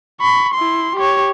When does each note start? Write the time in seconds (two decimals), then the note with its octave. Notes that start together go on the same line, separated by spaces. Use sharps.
0.21 B5 C#6
0.55 E4 C6
0.96 G4 C#5